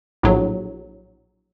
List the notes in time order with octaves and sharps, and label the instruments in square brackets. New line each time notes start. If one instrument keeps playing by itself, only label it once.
[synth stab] A#1 A2 F#3